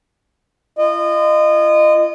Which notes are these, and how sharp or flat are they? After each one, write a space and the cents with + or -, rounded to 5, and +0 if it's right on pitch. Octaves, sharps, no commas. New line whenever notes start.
F4 -40 D#5 -25